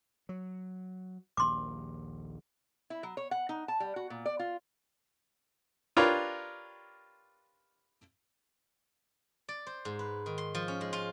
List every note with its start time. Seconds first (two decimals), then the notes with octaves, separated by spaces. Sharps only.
0.29 F#3
1.37 A#1 D#2 C6 D6
2.90 E4
3.03 F#3
3.17 C#5
3.31 F#5
3.49 D#4
3.68 A5
3.80 G3
3.96 F#4
4.10 A#2
4.26 D5
4.39 F4
5.97 D4 F4 G4 A#4 B4 C#5
9.49 D5
9.67 C5
9.85 G#2
9.99 B4
10.26 D#3
10.38 C6
10.55 F3
10.68 C#4
10.81 G#3
10.93 F4